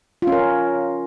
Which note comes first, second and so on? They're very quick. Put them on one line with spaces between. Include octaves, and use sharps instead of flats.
F4 C#4 A#4